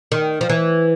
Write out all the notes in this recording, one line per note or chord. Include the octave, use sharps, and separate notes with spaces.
D#3
F3
E3